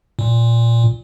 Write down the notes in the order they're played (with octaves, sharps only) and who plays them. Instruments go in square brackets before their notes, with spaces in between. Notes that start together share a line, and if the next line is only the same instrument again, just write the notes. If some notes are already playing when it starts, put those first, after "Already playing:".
[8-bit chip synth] A#2